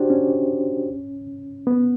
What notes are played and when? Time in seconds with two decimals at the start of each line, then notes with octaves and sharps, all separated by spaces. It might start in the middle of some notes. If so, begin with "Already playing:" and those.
Already playing: D4 F#4 G4 C5
0.10 C#4
1.67 B3